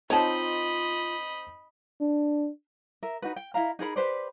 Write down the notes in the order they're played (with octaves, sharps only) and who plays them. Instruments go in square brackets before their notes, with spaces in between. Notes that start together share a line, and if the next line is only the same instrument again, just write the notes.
[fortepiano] C4 D#4 [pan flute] F4 [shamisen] C#5 A5 [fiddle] D#5 B5
[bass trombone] D4
[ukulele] A#4 E5
D#4 F#4 B4
G5
E4 D#5 F5 A#5
D#4 G#4 A#4 B5
G4 B4 C5 D5